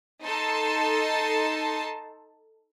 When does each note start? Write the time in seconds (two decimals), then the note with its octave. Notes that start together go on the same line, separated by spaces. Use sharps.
0.23 D#4 A4 A5 C6